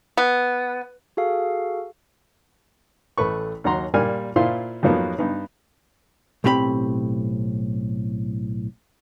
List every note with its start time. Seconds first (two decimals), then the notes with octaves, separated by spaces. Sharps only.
0.17 B3
1.17 F#4 G#4 A4 F5
3.18 A1 A3 B4 C#6
3.64 D#2 F#3 F#5 A#5 C6
3.94 A#2 G3 A#3 G#5 F6
4.36 A#2 E4 F4 C5 C6
4.83 F2 G#2 F3 F#3 A#3 B3
5.19 G2 B3 D#4
6.44 B1 A2 C4 G4 G5 B5